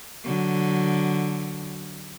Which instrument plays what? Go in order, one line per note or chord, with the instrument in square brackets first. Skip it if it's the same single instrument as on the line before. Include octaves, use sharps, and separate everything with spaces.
[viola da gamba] D3 F#3